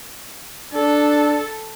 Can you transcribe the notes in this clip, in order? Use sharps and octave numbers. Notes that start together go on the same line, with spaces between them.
D4 A4